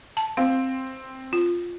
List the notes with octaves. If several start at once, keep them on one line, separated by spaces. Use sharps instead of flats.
A5
C4 F5
F4